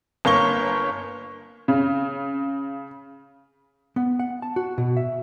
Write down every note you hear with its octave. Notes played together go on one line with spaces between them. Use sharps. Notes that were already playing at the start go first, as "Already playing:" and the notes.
G1 A#3 C#5 C#6 G7
C#3
B3
F#5
A5
F#4
B2
E5